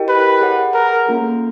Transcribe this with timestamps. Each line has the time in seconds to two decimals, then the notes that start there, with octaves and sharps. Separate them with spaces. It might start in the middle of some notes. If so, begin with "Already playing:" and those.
Already playing: E4 G4 A#4 D#5 G5
0.09 B4
0.41 G#4 C#5 F#5
0.74 A#4
1.06 A#3 C#4 F4 A4